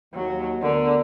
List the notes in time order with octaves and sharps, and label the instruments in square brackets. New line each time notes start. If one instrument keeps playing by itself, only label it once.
[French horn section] D#2 [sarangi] F#3
[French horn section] D2 B3 A#4 [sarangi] D3